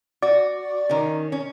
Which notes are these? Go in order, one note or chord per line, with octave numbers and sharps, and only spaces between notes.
F#4 D5
D#3 C#4
C#4